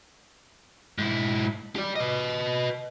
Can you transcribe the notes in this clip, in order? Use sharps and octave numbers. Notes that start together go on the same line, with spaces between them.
G#2 E4
G4 D5
B4 D#5